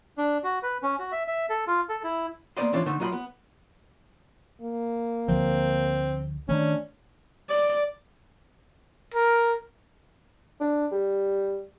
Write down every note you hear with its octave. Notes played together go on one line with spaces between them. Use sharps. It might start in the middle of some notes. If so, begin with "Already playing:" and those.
D4
F#4
B4
C#4
F#4
E5
E5
A4
F4
A4
E4
A#3 B3 C5 D5 D#5 C6
E3 F3 C#4 D4 E4 F4
D3 A3 D#4 C5
F#3 F4 D#5 F#5 B5 C6
B3
A#3
D2 D3 F3 C4
D#3 A3 C#4 D4
D5
A#4
D4
G3